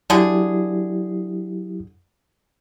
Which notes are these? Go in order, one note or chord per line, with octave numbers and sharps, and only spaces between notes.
D3 F#3 E4 G4 G#4